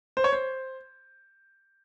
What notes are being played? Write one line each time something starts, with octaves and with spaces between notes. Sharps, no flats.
C5
C#5
C5